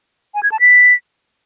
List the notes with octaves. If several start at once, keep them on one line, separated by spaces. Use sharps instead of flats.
G#5
G#6
A5
B6